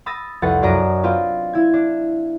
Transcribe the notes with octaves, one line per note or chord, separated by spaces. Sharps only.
B5 D#6 E6 A6 A#6
C2 F2 B4 F#5 A6 C#7
F#2 D4 D5 D#5 A#5 B6
C4 F4 B4
E4 G#6
D4